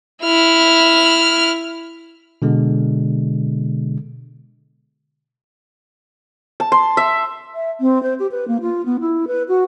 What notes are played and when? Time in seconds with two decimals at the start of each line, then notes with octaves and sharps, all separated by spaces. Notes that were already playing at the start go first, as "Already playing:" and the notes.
0.23 E4 F6
2.42 B2 D3 G#3
6.60 A5
6.72 C6
6.97 E5
7.54 E5
7.81 C4
8.03 C5
8.19 G4
8.31 B4
8.48 A#3
8.61 F4
8.85 B3
9.00 E4
9.27 B4
9.48 F#4